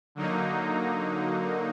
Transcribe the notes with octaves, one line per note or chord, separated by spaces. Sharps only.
D3 F#3 A#3 D#4